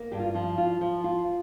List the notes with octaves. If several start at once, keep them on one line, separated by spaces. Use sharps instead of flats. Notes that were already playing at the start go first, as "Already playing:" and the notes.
Already playing: A#3
G2 G4
F4
F3 F4
F4
F3
F4